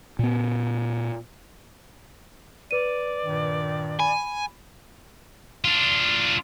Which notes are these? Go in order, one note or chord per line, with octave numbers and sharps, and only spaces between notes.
A#2 B3
B4 D5 D#7
G2 A#2 D#3
G#5 B5
D4 F4